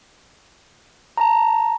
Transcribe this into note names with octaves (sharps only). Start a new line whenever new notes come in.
A5 A#5